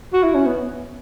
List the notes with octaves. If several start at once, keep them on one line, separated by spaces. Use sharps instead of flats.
F#4
E4
C#4
B3